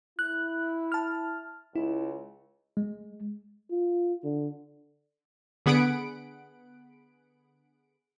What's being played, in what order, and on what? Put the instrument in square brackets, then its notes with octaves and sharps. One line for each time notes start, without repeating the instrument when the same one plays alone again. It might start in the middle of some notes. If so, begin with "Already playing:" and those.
[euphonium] E4 [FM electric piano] F#6
[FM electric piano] A5 F6
[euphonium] C#2 [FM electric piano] E4
[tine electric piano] G#3
[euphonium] F4
D3
[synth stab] D3 B3 G#4 F#5 B5 D7